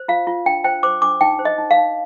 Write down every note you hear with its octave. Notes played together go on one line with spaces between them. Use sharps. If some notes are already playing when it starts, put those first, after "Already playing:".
Already playing: C5
F4 F5
F4
D4 G5
C5 G5
C5 D6
D4 D6
D#4 G5
C5
D#5
D#4
F5
D#4